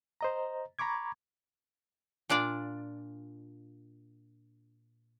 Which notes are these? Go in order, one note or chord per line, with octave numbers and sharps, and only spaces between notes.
C5 D#5 A#5
A#5 B5 C#6 D6 G#6
A#2 D4 F4 D5